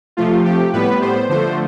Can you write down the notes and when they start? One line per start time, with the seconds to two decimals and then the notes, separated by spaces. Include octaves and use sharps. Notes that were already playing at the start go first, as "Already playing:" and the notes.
0.17 C3 F3 A3 F4
0.45 G4
0.73 A2 G3 B3 B4
1.02 C5
1.29 D3 F3 A3 C5